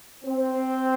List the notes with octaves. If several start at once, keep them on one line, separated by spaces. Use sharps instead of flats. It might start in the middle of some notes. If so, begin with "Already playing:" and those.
C4